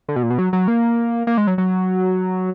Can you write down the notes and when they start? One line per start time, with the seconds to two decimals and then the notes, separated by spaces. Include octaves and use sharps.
0.08 D3
0.16 B2
0.23 A#2
0.30 B2
0.38 F#3
0.53 F#3
0.68 A#3
1.27 A#3
1.37 G#3
1.47 F#3
1.58 F#3